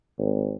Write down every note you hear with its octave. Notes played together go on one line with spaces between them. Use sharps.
G#1